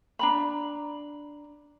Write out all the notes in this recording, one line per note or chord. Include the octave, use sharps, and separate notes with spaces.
D4 A#5 B5